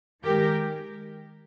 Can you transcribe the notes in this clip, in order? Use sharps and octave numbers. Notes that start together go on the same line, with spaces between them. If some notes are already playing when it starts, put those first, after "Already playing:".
D#3 G#3 G4 A#4